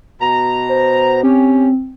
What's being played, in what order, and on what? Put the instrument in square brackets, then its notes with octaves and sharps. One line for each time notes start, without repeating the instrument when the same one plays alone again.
[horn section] B2 A#5
[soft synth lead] C5
[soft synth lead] C4 [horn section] C#4 G4